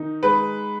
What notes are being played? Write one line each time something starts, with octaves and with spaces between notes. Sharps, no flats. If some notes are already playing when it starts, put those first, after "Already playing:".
Already playing: D#3 D#4
G#3 B4